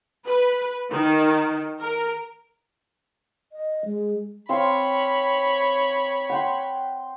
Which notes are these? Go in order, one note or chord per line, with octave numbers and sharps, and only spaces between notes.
B4
D#3
A#4
D#5
G#3
C4 C#5 F5 B5 C6
F#5 G5 C6